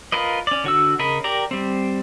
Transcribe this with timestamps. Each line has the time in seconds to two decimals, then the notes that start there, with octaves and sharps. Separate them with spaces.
0.12 F4 A#4 B4 D#5
0.47 C#4 D5
0.64 D3 F#4 E6
0.99 C#3 A#4 D#5 B5
1.24 G4 A#4 D5 A#5
1.51 G3 C4